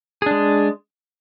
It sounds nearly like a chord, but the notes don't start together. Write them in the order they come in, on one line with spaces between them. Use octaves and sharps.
G#4 D4 G#3